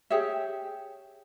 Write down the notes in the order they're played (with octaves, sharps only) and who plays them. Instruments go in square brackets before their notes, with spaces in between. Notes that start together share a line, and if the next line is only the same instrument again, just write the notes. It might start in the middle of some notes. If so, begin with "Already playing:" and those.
[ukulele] G4 G#4 C#5 E5